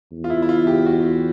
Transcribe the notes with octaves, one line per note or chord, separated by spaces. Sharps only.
E2
F4
E4
E4
F4
G4
F#4